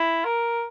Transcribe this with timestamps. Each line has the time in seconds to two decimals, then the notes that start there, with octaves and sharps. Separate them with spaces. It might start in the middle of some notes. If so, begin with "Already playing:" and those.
Already playing: E4
0.25 A#4